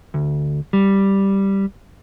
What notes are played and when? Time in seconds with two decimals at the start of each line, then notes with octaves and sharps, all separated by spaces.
0.14 D2
0.73 G3